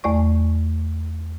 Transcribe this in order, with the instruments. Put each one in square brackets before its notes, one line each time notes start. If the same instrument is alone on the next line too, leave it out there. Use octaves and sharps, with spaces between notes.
[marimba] E2 A3 D5 C#6